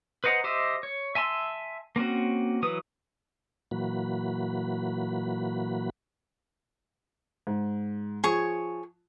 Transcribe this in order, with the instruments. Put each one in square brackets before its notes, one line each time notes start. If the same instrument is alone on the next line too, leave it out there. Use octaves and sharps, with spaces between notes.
[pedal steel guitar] B4 C5 D#5 F#5 A#5
G4 C5 D#5 E5
C#5
E5 G#5 A5 C6 E6
A#3 C4 C#4 F#4
E3 F#3 B4 D#6
[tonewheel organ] A#2 E3 F#3 A#3 F#4 B5
[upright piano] G#2
[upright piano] F3 [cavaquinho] G#4 C#5 C#6